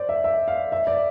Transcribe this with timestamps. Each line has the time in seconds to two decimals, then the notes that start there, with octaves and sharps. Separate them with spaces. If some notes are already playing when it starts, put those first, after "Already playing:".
Already playing: C5 D5
0.09 E5
0.24 E5
0.48 F5
0.72 E5
0.87 D5